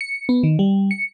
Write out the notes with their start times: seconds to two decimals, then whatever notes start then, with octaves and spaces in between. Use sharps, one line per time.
0.01 C#7
0.29 B3
0.43 D#3
0.59 G3
0.91 C#7